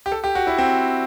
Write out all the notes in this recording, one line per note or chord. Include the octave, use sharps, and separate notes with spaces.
G4
A4
G4
F#4
E4
C4